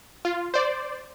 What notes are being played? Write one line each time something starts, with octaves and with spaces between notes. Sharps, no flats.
F4
C5 D5